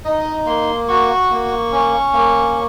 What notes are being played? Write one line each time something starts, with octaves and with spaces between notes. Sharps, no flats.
D#4 D#5
A#3 C6
F#4 C#6
A#3
C#4
A#3